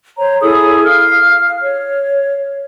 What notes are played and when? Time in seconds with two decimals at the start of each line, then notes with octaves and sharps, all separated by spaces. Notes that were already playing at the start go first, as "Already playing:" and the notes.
0.17 C5 C#5 A#5
0.41 E4 G#4 A4 D#6
0.85 F5 F6
1.62 C#5